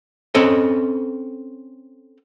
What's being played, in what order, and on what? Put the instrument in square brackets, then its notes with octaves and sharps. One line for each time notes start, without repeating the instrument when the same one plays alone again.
[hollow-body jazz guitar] C4 C#4 A4 D#5